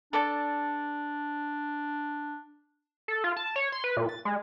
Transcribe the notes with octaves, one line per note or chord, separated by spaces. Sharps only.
D4 A4 D5 A5
A4
F4
A5
C#5
C6
B4
A#2
A6
G#3